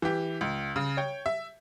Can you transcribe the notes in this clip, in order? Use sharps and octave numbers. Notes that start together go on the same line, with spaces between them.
E3 G4
C#2
C#3
C#5 G5
E5